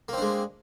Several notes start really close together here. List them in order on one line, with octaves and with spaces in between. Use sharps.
A#3 C4 D4 G#3